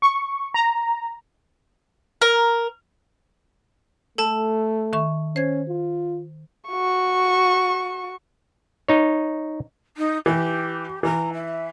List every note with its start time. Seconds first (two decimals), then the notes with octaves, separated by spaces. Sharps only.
0.02 C#6
0.54 A#5
2.22 A#4
4.18 A3 A4 A5
4.93 D#3 E5 C#6
5.36 C#4 C5 G#6
5.69 F4
6.69 F#4 C#6
8.88 D#4 C#5
9.97 D#4
10.26 E3 G4
11.03 E3 A#5
11.34 E5